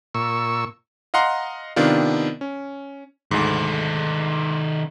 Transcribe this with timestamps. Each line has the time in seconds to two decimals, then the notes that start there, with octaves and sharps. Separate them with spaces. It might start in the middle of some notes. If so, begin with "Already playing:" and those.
0.15 A#2 C#6 E6
1.14 D#5 F5 F#5 A#5 C6
1.76 C3 D#3 B3 D4 F4
2.41 C#4
3.31 D2 G#2 D#3 A4